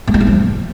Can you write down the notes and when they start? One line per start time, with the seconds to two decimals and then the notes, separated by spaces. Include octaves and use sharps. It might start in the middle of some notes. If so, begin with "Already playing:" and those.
0.08 A3
0.14 G#3
0.21 A3
0.27 F3